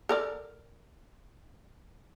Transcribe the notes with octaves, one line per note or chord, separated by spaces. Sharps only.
A4 A#4 D5